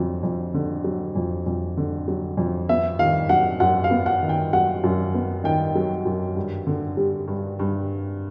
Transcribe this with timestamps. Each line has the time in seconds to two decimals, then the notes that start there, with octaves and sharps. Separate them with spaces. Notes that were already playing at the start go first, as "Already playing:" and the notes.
Already playing: F2 D3 F#3
0.23 F2
0.54 D3
0.84 F#3
1.16 F2
1.46 F2
1.77 D3
2.08 F#3
2.37 F2
2.69 B3 E5
2.99 D#3 F5
3.29 F#3 F#5
3.60 F#2 F#5
3.84 F5
3.91 B3
4.06 F#5
4.23 D#3
4.29 G5
4.53 F#3 F#5
4.84 F#2
5.14 B3
5.44 D#3 G5
5.75 F#3
6.06 F#2
6.36 G2
6.67 D3
6.97 G3
7.28 G2
7.59 G2